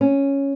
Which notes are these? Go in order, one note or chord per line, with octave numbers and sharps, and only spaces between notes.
C#4